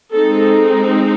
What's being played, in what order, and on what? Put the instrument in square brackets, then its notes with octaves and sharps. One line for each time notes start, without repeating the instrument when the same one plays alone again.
[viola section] G#3 C4 D#4 A4